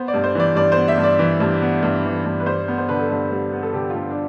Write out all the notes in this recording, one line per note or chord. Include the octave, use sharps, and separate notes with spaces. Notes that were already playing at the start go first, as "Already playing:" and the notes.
Already playing: B3 C5
D5
G2
C5
E3 D5
G2 D5
C5
B3
E5
G2
D5
E3
G2
B3
G2
E3
G2
B4
G3 C5
B3
C5
D3 B4
A4
G2 B4
G3
B3
A4
D3 G4
G2 F4
D4